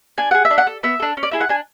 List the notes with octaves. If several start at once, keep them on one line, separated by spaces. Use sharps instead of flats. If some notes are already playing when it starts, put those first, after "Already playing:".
D4 G#5
G#4 F#5
E5
D4
F#5
A4
B3 E5
D4 A4
C#4
D5
E4 G#4 E5
F#5
D4 G#5